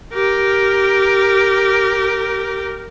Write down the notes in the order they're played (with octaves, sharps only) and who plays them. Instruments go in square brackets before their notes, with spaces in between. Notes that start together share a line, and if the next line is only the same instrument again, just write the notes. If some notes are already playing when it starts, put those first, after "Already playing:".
[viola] G4 A#4